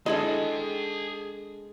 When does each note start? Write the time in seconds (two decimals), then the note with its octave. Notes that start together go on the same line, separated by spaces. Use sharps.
0.06 G#3 D4 E4 G#4 A4 D#5 A5